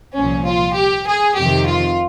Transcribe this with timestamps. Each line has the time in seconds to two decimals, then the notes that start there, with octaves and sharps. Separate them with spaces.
0.16 C2 A#2 F3 C#4
0.47 F4
0.77 G4
1.07 G#4
1.37 F2 C3 D#3 G4
1.68 F4